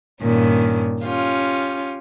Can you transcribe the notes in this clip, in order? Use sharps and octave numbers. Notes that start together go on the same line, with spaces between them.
G2 A#2 D#3 C#4
C#4 F4 G4